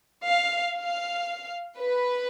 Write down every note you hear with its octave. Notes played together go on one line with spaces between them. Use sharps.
F5
F5
B4